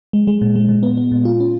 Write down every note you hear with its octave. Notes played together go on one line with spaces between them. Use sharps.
G#3
G#3
A#2
G#3
A#2
B3
B3
A#2
F4
C#4